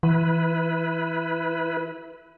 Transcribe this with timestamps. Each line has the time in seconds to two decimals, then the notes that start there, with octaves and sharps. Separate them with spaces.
0.03 E3 E4 B4